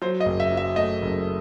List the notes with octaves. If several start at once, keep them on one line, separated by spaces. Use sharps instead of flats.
F#3 C5
D#5
F#1
E5
F#3
E5
A3 D#5
F#1